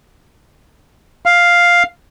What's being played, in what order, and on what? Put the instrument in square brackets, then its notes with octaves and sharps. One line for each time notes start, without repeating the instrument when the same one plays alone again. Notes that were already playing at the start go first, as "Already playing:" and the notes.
[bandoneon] F5